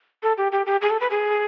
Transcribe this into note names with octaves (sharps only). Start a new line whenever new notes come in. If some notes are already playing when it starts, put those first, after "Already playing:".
A4
G4
G4
G4
G#4
A4
B4
G#4